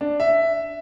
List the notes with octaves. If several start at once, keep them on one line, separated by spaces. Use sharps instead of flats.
D4
E5